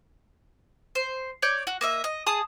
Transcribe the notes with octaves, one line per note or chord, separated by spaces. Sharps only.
C5
C#5 D5 G6
F#4
A#3 D#5 E5
D#5
G#4 A5 D#6